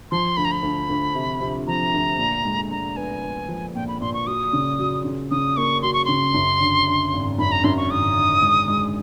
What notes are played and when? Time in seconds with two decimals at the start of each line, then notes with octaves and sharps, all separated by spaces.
0.11 F3 C6
0.37 D2 B5
0.45 A#5
0.52 B5
0.63 D2
0.89 D2
1.15 C3
1.40 C3
1.67 F3 A#5
1.94 D2
2.18 A#2
2.45 G#3
2.71 G#3 A#5
2.96 B3 G#5
3.24 B3
3.48 F3
3.75 A#2 G5
3.88 B5
4.01 A#2 C6
4.14 C#6
4.27 F#3 D#6
4.53 C#3
4.79 F#3
5.04 C#3
5.31 C#3 D#6
5.57 A#3 C#6
5.82 F#3 C6
5.94 C#6
6.05 C#3 C6
6.34 F#2
6.60 D3
6.87 D3
7.13 G#1
7.38 F#2 B5
7.52 A#5
7.64 F#2 C6
7.77 C#6
7.90 G#1 D#6
8.17 D3
8.42 G#3
8.68 G#3